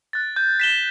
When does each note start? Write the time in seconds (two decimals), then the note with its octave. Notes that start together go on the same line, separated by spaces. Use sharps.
0.13 F#6 A6
0.36 G6
0.60 B6 E7 G7